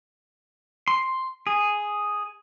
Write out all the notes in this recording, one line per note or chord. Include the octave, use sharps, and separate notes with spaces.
C6
G#4